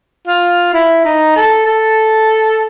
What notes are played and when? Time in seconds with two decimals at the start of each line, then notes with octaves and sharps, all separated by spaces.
0.27 F4
0.74 E4
1.04 D#4
1.36 A4
1.66 A4